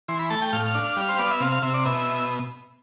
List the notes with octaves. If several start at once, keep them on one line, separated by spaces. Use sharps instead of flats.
E3 C6
B5
A3 A5
G5
A2 F5
D4
G3
C5
B3 D5
E5
C3 F5
F5
C3 E5
D5
B2 E5